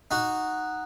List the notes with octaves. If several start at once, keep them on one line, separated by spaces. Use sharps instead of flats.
D#4 F#4